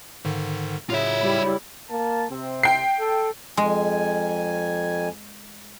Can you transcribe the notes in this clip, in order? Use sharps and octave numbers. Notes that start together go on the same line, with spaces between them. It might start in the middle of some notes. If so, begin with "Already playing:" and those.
G#2 D3 D#3 F5
F#2 A2 C#3 F4 E5
G3 E4
A#3 A5
C3 C4
G5 C7
A4
F2 G#3 G#5